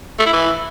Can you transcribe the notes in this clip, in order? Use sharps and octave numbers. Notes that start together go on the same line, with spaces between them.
A3
E4
E3